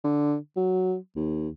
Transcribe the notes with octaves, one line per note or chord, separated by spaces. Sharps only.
D3
F#3
D#2